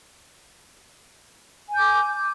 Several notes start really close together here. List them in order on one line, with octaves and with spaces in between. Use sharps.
G#5 G6 D6